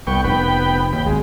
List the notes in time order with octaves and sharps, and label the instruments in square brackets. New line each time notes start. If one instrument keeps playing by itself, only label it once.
[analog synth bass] C2 [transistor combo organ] B3 G5 C#6
[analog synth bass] F1 [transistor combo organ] B3 G5 B5
[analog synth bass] F1
[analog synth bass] D#2 [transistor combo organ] G5 B5
[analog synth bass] G#1 [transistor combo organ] G#3